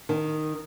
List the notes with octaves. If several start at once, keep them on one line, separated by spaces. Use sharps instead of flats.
D#3